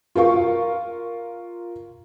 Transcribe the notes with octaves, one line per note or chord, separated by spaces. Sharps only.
F4 A#4 F5 C#6